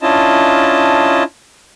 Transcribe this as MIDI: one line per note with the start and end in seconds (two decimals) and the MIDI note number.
0.01 1.23 61
0.01 1.23 62
0.01 1.23 64
0.01 1.23 65
0.01 1.23 75
0.01 1.23 81